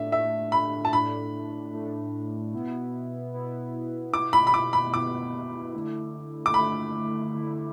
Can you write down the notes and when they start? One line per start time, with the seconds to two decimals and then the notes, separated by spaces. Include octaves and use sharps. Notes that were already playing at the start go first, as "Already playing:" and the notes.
Already playing: A2 A3 D4 E5
0.12 A2 A3 D4 E5
0.52 B5
0.85 A5
0.93 A2 A3 D4 B5
1.73 A2 A3 D4
2.53 B2 B3 E4
3.33 B2 B3 E4
4.13 B2 B3 E4 D6
4.33 B5
4.47 B5
4.54 D6
4.73 B5
4.93 B2 B3 E4 D6
5.73 D3 A3 E4
6.46 D6
6.54 D3 A3 E4 B5
7.34 D3 A3 E4